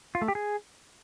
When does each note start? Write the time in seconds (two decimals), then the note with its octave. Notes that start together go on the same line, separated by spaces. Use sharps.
0.15 F4
0.22 A3
0.28 G4
0.35 G#4